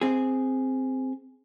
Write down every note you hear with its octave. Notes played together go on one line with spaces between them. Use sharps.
C4 G#4